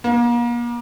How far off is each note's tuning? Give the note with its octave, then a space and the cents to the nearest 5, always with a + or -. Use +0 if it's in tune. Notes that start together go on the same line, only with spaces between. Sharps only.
A#3 +40